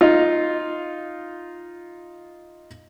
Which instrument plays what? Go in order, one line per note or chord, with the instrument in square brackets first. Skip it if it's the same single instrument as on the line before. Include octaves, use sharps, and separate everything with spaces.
[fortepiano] D#4 F4